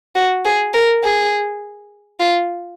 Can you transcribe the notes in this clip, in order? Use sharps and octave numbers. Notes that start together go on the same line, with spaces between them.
F#4
G#4
A#4
G#4
F4